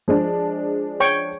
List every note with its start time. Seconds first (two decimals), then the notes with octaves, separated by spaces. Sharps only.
0.08 F3 G#3 D4
1.00 C#5 G5 C#6